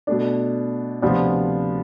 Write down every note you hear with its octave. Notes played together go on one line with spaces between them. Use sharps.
B2 A3 D4
D2 C3 F3 B3 D4